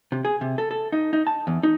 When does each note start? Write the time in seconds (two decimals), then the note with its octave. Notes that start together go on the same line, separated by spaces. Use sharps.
0.12 C3
0.25 G#4
0.41 C3
0.58 A4
0.71 A4
0.92 D#4
1.13 D#4
1.27 A5
1.47 E2
1.63 D#4